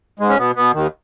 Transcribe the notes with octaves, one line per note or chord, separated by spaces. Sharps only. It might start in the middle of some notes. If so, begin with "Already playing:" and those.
G#2 G#3
C#4
B2 B3
B2 B3
D#2 D#3